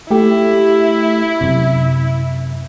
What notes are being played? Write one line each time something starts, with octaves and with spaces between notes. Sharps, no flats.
A3 E4 G4
F#2 C3